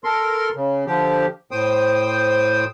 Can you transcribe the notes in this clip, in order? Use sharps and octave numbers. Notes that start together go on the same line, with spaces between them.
A4 A#4 C6
C#3
D3 F3 G4
A2 C5 G5 D#6